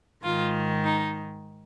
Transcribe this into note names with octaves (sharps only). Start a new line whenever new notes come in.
G#2 D#3 F4
D#4